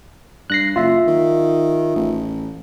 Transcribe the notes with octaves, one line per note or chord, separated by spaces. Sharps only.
G2 F#6 A#6 C7
F#1 F4 E5
D#3
A1